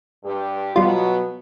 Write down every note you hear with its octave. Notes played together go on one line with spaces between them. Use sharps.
G2 G4
B2 F#3 G3 B3 F4